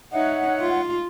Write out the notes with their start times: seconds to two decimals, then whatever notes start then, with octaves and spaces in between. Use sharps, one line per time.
0.13 D#4 C#5 E5 F#5
0.60 F4